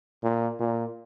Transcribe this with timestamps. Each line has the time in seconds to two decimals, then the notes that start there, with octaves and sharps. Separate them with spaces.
0.23 A#2
0.60 A#2